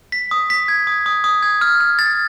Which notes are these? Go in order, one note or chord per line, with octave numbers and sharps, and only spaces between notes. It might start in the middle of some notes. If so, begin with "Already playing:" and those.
B6
D#6
B6
G#6
D#6
D#6
D#6
G#6
F6
F6
A6